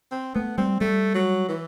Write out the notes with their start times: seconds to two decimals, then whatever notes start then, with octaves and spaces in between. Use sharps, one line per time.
0.12 C4
0.34 A3 B3
0.58 G3 C4
0.81 G3 A3
1.15 F#3
1.49 E3